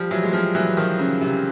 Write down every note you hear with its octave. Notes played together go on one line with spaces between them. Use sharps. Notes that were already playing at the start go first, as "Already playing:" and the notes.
Already playing: F3 G3
E3 F#3
G#3
F3 G3
E3 F#3
D#3 F3
C#3
C3